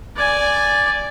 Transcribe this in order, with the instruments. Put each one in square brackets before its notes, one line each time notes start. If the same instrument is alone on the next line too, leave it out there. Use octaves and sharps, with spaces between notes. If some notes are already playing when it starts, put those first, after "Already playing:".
[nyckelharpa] D5 G#5